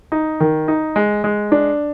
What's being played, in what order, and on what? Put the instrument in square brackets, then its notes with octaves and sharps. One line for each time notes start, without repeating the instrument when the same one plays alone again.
[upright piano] D#4
D#3
D#4
G#3
G#3
D4